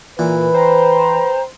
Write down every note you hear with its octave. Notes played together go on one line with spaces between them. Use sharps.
A#2 E3 B4
C5 G5 A#5